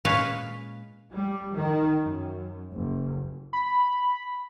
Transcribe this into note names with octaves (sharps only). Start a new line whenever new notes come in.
A#2 G#3 C#4 B4 C#5 F5
G3
D#3
F#2
F#1
B5